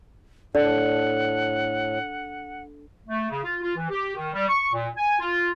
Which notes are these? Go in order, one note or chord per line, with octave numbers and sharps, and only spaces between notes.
A2 D4 A4 D5 F#5
A3
C#3
F4
F4
E3
G4
D#3
G3
C#6
A#2
G#5
F4